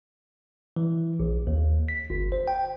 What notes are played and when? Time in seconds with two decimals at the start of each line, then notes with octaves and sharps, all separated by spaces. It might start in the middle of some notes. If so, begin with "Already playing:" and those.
0.76 E3
1.20 A#1
1.47 D#2
1.88 B6
2.10 G1
2.32 C5
2.48 G5